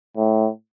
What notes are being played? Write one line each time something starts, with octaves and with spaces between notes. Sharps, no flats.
A2